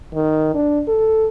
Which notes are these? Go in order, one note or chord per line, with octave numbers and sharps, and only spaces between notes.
D#3
D4
A4